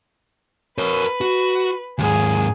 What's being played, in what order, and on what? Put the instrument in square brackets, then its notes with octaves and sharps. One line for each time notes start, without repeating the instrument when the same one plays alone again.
[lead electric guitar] A#4 C#5 [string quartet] B4
[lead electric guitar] F#4
[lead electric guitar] D#2 G#2 [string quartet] G#4